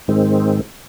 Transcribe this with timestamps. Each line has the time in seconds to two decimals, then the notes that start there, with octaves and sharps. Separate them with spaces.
0.08 G#2 D#3 G#3 C4